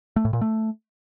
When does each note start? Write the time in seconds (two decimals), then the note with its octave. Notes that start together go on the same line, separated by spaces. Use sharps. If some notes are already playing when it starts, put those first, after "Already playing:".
0.16 A3
0.25 A2
0.33 A#2
0.41 A3